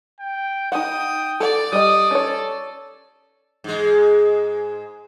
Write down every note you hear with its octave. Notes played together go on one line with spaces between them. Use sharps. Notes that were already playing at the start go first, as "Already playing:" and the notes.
G5
D#4 F#5 G5 D#6
A4 D5 F#5
G3 D#5 D#6
C#4 A4 C#5
G#2 G#3